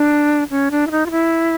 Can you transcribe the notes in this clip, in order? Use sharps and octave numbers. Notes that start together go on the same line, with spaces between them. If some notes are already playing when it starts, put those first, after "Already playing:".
Already playing: D4
C#4
D4
E4
D#4
F4
E4